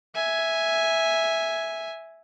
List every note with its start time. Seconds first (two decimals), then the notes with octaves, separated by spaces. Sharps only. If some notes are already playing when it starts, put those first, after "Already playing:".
0.15 E5 G#5